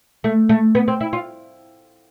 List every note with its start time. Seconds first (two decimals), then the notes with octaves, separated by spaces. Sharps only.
0.24 A3
0.49 A3
0.75 B3
0.88 C4
1.01 E4
1.13 F4